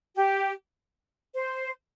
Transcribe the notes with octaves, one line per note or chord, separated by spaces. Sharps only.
G4
C5